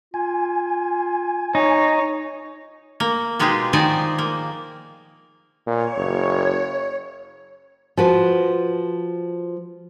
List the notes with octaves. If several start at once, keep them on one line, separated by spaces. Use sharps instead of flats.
F4 G#5
D#4 C#5
A#3
B2 G#3 D#4 F4 G4 G#4
D#3 F3 D#4 C5 D5 G#5
A#3
A#2 C#5
F#1
F3 F#4 B4